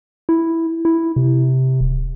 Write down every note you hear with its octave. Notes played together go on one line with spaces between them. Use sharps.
E4
E4
C3
D1